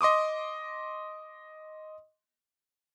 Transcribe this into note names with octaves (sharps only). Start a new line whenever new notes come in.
D#5 C6 D6 D#6